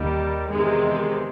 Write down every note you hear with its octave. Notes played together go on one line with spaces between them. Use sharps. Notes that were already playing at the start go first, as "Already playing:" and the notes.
Already playing: D#2 D#3 G3
E2 C3 D#3 G#3